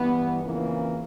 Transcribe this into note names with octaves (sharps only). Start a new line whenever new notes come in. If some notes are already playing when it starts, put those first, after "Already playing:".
Already playing: G2 E3 B3
F2 C#3 E3 A#3